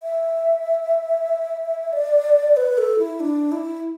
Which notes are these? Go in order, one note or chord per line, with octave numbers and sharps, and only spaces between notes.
E5
D5
B4
A4
E4
D4
E4